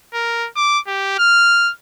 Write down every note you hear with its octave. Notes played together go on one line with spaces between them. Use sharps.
A#4
D6
G4
F6